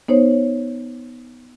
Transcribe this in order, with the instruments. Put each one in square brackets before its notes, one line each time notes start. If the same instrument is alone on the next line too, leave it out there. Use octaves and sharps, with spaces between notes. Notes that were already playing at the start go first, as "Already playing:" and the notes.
[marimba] B3 D#4 C5 C#5